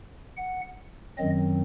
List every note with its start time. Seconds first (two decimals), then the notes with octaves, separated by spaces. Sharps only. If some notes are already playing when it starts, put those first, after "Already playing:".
0.37 F#5
1.18 F#2 D#3 F#3 C4 D#5